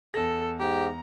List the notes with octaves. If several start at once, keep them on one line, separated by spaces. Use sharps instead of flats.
E2 A4 A#6
G#2 G4 A#5